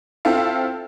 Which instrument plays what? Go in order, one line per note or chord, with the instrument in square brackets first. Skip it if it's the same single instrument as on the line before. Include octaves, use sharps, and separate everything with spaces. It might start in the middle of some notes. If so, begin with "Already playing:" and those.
[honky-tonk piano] C4 E4 F4 A4 F5